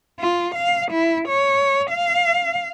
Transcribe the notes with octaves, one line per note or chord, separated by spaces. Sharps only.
F4
F5
E4
C#5
F5